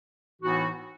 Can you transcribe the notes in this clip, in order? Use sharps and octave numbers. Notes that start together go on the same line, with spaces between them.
A2 E3 B3 D#4 F#4